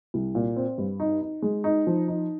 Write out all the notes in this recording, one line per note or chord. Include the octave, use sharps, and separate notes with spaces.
C2
A#2
C4
G2
D#4
D#4
G#3
D#4
F3
D#4